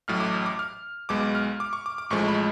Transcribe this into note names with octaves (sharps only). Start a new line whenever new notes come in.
A1 A2 F#3 F6
D6
D6
F6
B1 B2 G#3 D6
F6
D6
C#6
D6
D6
A1 A2 F3 G#3 C#6
B5